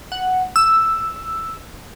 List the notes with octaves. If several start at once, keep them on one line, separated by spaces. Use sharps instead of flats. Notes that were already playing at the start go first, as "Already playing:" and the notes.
F#5
E6